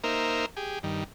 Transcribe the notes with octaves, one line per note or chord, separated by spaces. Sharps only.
A#3 D#4 A#4 C5 E5
G4 G#4
G2 D#3